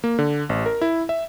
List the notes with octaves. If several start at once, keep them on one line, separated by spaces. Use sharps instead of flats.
A#3
D3
A1
A#4
E4
E5